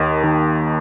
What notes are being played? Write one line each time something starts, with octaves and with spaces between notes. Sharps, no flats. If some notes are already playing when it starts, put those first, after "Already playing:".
Already playing: D#2 D#3
D#3